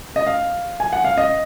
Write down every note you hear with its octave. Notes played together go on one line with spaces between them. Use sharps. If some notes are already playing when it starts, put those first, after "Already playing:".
D#5
F5
G#5
F#5
F5
D#5